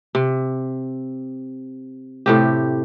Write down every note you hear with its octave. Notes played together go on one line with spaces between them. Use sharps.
C3
A2 C3 G4